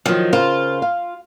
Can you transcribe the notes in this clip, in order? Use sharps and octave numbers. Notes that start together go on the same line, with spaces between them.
D#3 F3 F#3
C#3 F4 A#4 C5
F5